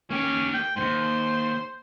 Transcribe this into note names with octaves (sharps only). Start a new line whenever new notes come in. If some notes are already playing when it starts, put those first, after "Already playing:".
A#3 C#4 G4
G5
D#2 G#2 C5